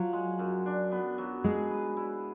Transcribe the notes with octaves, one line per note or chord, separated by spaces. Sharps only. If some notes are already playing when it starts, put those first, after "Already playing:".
Already playing: F3 F#3
G#3
F#2
D4
B3
F#3
G#3 G#4
B4
E4